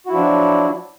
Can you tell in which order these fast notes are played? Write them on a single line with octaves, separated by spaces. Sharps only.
F#4 E4 F3 D4 F#3